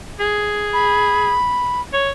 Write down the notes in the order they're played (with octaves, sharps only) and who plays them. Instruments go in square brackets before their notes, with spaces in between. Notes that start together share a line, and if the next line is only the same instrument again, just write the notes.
[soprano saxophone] G#4
[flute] B5
[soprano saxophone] C#5